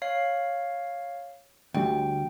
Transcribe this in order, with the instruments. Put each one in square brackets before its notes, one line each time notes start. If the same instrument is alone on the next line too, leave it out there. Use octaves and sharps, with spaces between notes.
[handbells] C#5 F5 C7
[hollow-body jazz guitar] D2 [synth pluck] D3 G3 [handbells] G5